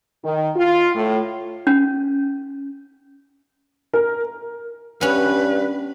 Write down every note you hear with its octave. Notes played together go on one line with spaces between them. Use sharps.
D#3
F4
A2
C#4
A#4
G2 B3 C#4 B4